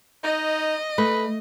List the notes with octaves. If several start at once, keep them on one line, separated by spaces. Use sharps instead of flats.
D#4 D#5
A3 B4